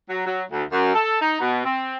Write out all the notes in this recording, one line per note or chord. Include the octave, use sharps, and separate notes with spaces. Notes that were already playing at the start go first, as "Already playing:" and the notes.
F#3
F#3
D2
F#2
A4
D#4
B2
C4